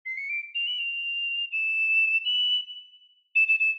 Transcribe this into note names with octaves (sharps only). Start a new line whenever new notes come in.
C7
C#7
D7
F7
F#7
F7
E7
F#7
E7
E7
E7